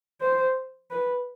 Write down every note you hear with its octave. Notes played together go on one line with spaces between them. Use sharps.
C5
B4